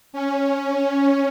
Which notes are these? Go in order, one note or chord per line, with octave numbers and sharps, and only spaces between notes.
C#4